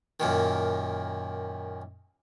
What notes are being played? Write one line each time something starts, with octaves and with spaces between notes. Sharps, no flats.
F#2 A#2 D#3